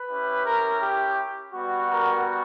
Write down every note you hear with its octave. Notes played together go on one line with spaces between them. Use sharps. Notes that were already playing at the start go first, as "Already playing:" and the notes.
Already playing: B4
C#4 E4 G4
A#4
G4
G3 B3 F#4
A#4